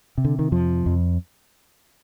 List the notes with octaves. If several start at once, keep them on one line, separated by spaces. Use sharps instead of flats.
C3
D3
D#3
F2 F3
F2